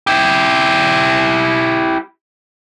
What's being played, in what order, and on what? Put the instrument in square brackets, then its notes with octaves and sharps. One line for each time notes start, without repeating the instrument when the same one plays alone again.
[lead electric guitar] E4 G4